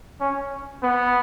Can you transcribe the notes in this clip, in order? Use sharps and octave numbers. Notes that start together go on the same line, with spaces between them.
C#4
B3